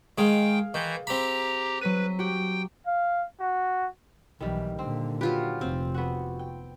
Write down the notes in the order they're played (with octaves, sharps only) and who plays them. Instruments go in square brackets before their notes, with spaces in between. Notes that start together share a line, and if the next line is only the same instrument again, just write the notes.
[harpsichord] D#3 G#3 [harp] G#4 F5 [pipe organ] G5
[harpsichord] D#3 [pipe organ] E3 G6
[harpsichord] C4 B5 [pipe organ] G4 A#5
[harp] F#3 B6 D#7 [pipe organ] B4
[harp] F#4 G4 [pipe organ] G5
[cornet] F5
F#4
[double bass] B1 E3 [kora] D#3 G3
[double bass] A#2 D3 [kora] C4
[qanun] F#3 F4 G4 [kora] B4
[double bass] F1 [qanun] C4
[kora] B3 F#4
G5